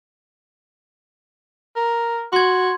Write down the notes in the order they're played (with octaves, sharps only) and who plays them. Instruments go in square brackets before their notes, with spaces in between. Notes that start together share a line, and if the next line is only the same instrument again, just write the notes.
[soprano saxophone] A#4
[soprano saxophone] F#4 [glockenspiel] C6 G#6